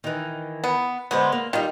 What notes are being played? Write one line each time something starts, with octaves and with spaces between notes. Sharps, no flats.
D#3 E3
B3
D3 G#3 B3 C5
A#3
D#3 G3 D#4 F4